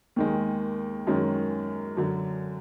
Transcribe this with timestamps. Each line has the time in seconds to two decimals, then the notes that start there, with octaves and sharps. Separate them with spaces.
0.16 D#2 D#3 G#3
1.07 F#2 D#3 G#3 C#4
1.97 F#2 D3 F#3